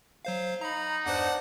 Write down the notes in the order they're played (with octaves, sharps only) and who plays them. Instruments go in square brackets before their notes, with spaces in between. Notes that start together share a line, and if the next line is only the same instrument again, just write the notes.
[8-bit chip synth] F#3 C5 F5
[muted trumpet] D#4 [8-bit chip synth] A#5 B5
[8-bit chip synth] E2 G2 C5 [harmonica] D4 F#5